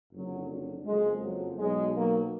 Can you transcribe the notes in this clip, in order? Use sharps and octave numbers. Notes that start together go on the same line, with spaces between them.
F#1 F2 D3 F#3
F#3
F#1 F2 F3 G#3
F#3
B1 B2 F#3 G#3
F#3 A#3